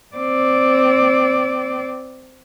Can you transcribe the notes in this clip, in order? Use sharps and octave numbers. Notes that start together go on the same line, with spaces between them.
C4 D5